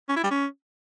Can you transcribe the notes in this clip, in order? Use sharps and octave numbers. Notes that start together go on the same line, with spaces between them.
C#4
E4
G3
C#4